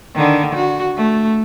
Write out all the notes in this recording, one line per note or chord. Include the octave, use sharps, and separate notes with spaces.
D3 D#3
F#4
A3